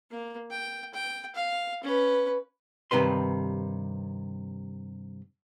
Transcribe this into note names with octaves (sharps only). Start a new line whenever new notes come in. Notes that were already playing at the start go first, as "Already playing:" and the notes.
A#3
G5
G5
F5
C#4 B4
G2 C3 D#3 B4 C6